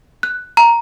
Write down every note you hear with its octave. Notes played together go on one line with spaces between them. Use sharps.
F#6
A#5